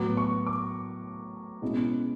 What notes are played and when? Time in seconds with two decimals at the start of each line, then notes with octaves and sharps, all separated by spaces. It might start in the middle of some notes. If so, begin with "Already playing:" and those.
Already playing: A2 F#3 B3 D6
0.17 C#6
0.47 D6
1.62 B2 G#3 C#4 E4